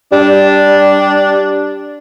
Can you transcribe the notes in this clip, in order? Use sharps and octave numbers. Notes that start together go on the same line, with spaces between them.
G3 D4